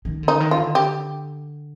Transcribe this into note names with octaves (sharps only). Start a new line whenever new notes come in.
D#3
D3
D#4
D#3
F4
D3
G4